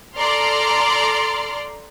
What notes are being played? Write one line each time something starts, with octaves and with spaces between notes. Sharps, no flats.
A4 D5 A#5 C6 F6